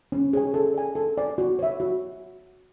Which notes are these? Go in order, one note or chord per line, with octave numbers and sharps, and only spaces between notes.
C#4
G#4 C#5 G#5
A4
D5 G#5
A4
D5 G#5
F#4
C#5 E5
F#4